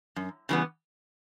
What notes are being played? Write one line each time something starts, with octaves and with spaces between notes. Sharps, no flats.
F#2
C#3 E3 G3 B3